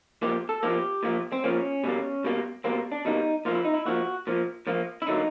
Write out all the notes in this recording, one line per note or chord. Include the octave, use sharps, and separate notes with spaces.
A#2 F3 A#3 G4
A4
A#2 F3 A#3 G4
A#2 F3 A#3
C4
A#2 F3 A#3 C#4
B2 G3 A#3
B2 G3 A#3
B2 G3 A#3 C4
D4
B2 G3 A#3 D#4
A#2 F3 A#3 F4
E4
D#4
E4
A#2 F3 A#3 F#4
A#2 F3 A#3
A#2 F3 A#3
E4
D3 F#3 A#3 D#4